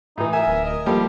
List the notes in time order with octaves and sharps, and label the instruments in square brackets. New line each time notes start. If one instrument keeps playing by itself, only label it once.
[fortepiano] A2 E3 [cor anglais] D#4
[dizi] A#4 [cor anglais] E5 [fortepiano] G#5
[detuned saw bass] D1
[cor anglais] D#5
[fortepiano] F3 G3 A4 [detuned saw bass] A#3 [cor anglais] G4